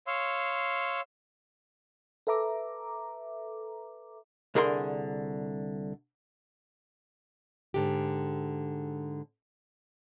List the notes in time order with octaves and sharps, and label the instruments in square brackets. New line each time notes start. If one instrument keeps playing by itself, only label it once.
[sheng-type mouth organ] C#5 F5 C6 E6
[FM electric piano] A4 B4 E5 A#5 D6
[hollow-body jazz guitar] C2 D3 G#4 A#4 D#5 C6
[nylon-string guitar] G#2 D3 G4